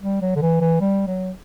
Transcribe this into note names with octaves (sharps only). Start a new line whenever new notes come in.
G3
F#3
D3
E3
E3
G3
F#3